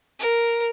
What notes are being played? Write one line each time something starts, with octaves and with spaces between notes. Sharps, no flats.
A#4